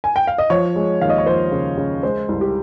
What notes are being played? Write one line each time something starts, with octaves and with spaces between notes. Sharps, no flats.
G#5
G5
F5
D#5
F3 C#5
G#3
D#2 F5
D#5
C#5
F3 C5
C#3
C#3
G#3 C5
C2
G4